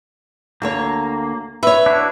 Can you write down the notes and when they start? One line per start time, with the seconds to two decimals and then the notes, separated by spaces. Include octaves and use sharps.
0.62 D2 A#3 A4 C#5
1.63 B4 C#5 E5
1.86 D4 E4 F#4